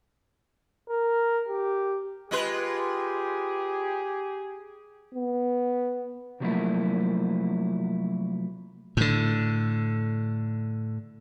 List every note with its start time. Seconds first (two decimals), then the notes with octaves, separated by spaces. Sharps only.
0.89 A#4
1.49 G4
2.31 G#3 F4 G4 G#4 B4
5.14 B3
6.40 C3 F3 F#3 A3 A#3 E4
8.97 A2 D3